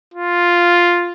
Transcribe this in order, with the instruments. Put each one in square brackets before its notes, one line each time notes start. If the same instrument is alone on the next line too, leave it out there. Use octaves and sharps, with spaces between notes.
[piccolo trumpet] F4